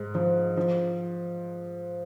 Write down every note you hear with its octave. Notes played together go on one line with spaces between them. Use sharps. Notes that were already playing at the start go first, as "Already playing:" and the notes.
Already playing: G#2
F3
F3